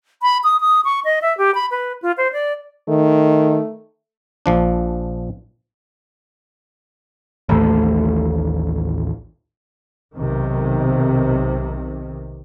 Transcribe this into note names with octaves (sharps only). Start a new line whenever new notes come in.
B5
D#6
D#6
C#6
D#5
E5
G4
B5
B4
F4
C5
D5
D#3 A3
A#1 F3 D4
A1 D#2 A2 A3
B1 C3 D#3